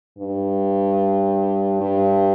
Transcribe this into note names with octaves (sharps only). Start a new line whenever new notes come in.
G2
G2